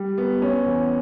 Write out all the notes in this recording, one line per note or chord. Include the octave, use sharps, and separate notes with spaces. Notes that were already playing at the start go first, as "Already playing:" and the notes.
Already playing: G3
B3
C#4
E2